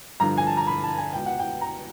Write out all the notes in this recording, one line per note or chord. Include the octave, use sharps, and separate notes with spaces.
G2 D3 F3 A#5
G#5
A5
A#5
B5
A5
G#5
C#2 B2 G5
F#5
G5
A#5